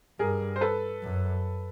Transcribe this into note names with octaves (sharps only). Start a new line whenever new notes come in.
G2 G#4 A#4
C5
A4 B4
F#2